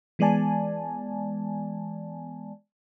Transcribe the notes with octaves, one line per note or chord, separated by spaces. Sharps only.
E3 G#3 B3 D5 G#5 A5